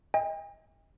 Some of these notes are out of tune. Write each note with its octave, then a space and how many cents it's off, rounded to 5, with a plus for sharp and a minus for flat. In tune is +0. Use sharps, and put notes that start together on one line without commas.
D#5 +35 G5 +45